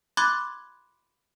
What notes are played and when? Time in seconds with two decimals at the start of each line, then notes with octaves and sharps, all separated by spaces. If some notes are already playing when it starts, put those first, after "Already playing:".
0.17 B5 C6 D6 F#6 G#6 A6